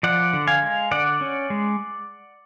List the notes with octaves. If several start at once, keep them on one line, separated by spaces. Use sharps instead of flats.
F3 D5 F#5
D3
F5 G#5
G#3
D3 D5 F#5
C#4
G#3